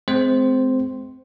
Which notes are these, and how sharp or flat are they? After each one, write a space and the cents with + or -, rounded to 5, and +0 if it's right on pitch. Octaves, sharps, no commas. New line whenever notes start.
G#3 +35 C4 -25 C5 +0